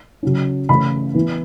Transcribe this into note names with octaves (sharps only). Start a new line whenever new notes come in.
C#3 F#3 C#4
C#3 E3 A3 C#4 B5
E3 B3